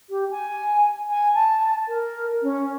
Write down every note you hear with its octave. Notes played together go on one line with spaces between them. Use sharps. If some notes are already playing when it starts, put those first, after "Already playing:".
G4
G#5
G#5
A5
A#4
C#4